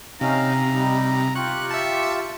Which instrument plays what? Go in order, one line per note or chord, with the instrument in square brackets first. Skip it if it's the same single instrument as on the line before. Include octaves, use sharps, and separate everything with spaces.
[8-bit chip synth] C3 [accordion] C#4 D#4 F5 [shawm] A#5
[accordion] G3 D#4
[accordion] F4 G4 [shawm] C#6 [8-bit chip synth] F#6
[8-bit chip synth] E5 A5